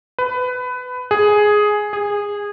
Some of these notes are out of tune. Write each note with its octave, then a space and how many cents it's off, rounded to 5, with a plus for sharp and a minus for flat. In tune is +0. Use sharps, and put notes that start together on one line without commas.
B4 +20
G#4 +5
G#4 -20